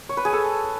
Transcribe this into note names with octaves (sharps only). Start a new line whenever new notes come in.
C#5
B4
G#4
A4